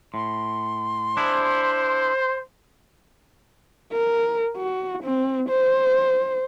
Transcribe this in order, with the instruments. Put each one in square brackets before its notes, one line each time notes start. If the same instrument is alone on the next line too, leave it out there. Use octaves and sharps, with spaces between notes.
[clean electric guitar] A2 [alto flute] C6
[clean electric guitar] D4 E4 G#4 [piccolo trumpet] C5
[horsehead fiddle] A#4
F#4
C4
C5